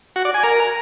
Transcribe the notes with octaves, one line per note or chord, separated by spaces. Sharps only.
F#4
D5
G#5
A#4